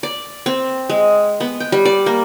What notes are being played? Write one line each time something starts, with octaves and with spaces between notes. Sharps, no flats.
D5
C4
G#3
B3
G5
G3
D5
A#3